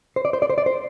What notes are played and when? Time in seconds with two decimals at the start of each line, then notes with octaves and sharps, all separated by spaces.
0.16 C5
0.25 D5
0.33 C5
0.42 D5
0.50 C5
0.58 D5
0.66 C5